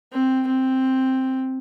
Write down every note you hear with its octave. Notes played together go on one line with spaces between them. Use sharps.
C4
C4